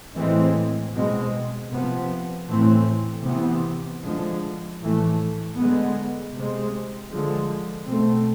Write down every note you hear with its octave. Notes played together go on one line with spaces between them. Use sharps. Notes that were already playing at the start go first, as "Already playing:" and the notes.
A2 E3 G#3 C4
B2 G#3 C4
C3 F3 B3
A2 E3 A3 C4
C3 E3 B3
D3 F3 G#3
A2 E3 A3
D3 G#3 B3
C3 G#3 C4
D3 F3 G#3
B2 A3 C4